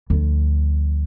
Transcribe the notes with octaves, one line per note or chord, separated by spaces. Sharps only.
D2 F3